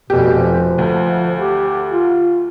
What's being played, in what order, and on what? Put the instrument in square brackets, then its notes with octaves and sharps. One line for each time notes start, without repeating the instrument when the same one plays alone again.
[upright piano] F1 G4 [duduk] B2
[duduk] F3
[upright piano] D2
[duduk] G4
F4